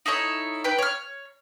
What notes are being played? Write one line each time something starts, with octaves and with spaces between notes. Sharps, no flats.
D#4 E4 A4 C#5
B4 G5
C#5 F6